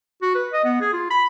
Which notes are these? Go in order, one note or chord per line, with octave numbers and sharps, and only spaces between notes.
F#4
B4
D#5
B3
G#4
F4
B5